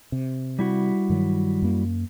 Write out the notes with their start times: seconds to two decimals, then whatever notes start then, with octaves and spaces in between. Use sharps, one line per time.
0.12 C3
0.59 G3 E4 F#4
1.10 G2 D#3 F#3
1.62 F#2 A#3